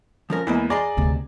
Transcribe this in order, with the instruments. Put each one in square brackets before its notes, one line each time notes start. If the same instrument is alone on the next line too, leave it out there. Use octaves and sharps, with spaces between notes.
[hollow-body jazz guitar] F3 C#4 A#4
[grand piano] E2 [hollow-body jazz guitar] G#3 A#3 E4
[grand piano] G#4 D5 [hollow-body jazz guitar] D#5 A#5 C6
[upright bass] D2 C3